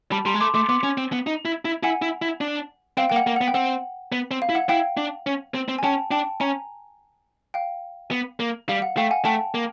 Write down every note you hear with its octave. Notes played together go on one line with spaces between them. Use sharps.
G3 A5 B5
G3 A#5 C6
G#3
A3 C6 D6
A3 C6 D6
B3 C6 D6
C#4
C4
B3
D#4
E4
E4
E4 F#5 G#5
E4
E4
D4
C4 F5 G5
A#3 G5
F#5
A#3
B3 F#5
G5
C4 F#5
B3
C4
F5
E4
F#5
E4 F5 G5
D4
C#4
C4
C4
G#5
C#4 G5 A5
D4 G5 A5
C#4 G#5 A#5
F5 G5
B3
A#3
G3 F5
F#5
A3 F5 G5
F#5 G#5
A3 G5 A5
A#3